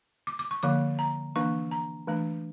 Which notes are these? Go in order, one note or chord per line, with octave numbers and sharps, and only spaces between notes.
D6
D6
C#6
D3 F3 A#3 D6
A#5
E3 A#3 D4 C#6
A#5
E3 A3 D4